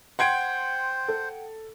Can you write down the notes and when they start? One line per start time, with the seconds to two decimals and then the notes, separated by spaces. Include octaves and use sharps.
0.19 C5 F#5 G5 C6 G#6 D7
1.08 A4